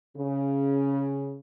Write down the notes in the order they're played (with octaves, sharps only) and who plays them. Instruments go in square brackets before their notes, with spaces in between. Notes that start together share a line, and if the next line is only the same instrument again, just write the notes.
[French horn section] C#3